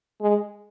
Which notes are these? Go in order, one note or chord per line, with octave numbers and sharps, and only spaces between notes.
G#3